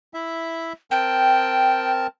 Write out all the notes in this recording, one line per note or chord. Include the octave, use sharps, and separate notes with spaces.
E4 E5
C4 A#4 G5 A5